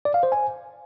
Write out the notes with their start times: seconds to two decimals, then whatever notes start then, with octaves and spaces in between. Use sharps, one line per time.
0.05 D5
0.14 F5
0.23 C5
0.32 G#5